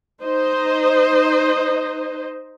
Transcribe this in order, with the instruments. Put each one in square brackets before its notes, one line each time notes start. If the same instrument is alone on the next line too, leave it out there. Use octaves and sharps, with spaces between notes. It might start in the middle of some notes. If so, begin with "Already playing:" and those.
[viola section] D#4 C5 D#5